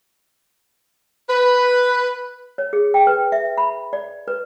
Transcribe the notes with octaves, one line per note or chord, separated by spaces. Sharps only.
B4
C#5
G#4
G5
B4
E5
B5
D5
B4